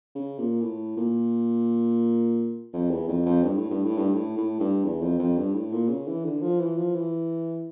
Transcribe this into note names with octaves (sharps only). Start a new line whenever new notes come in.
C#3
A#2
A2
A#2
F2
E2
F2
F2
G2
A2
G2
A2
G2
A2
A2
G2
E2
F2
F2
G2
A2
A#2
C#3
E3
D3
F3
E3
F3
E3